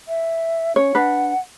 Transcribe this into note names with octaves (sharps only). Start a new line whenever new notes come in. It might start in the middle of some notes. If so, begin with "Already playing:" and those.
E5
C#4 C#5
D4 B4 F#5